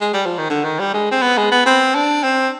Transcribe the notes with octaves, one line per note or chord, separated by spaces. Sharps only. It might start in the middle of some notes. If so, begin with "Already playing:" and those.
G#3
G3
F3
D#3
D3
D#3
G3
G#3
C4
B3
G#3
B3
C4
D4
C4